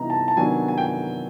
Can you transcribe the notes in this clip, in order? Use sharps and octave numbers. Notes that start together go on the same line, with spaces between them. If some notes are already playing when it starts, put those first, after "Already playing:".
Already playing: C3 E3 G3 B3 D#4 A#5
A5
A5
C3 D#3 F#3 B3 D4 G#5
G#5
G5